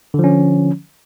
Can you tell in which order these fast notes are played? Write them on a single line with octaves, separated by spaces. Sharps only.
D3 F3 C#4